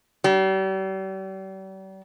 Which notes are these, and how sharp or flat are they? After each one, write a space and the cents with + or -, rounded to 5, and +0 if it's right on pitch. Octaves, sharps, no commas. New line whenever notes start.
G3 -40